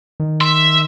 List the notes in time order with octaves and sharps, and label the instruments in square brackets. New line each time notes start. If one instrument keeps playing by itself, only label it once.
[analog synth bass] D#3
[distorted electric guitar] E5 [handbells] C6